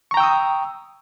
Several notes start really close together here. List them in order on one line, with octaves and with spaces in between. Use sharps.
C#6 A#5 G5 E6 D#6